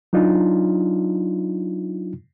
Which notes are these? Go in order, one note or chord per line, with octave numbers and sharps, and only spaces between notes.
F#3 D4 D#4 F4